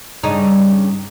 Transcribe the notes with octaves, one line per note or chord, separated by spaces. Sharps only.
G2 C#3 D#4